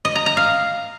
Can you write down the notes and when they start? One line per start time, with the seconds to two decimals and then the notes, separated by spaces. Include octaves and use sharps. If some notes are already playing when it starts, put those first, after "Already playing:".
0.05 D#5
0.15 A#5
0.26 A#5
0.37 F5